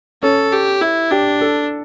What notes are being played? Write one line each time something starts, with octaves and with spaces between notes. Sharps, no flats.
C#4 A4
G4
E4
D4 G4
A4